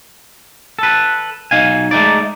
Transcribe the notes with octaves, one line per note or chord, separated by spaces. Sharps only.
A4 B4
B1 D#4 F5 G#5
G#3 A3 D#4 D5